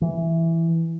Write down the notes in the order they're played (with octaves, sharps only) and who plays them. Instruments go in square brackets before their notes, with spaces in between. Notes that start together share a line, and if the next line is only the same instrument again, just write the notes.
[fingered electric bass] E3